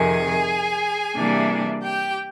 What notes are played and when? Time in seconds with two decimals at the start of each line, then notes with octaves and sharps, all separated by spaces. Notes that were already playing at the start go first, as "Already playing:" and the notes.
Already playing: F2 C3 D#3 G#4 G#5
1.16 C3 E3 G3 A#3 D4
1.82 G4 G5